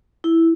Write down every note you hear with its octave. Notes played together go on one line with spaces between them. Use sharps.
E4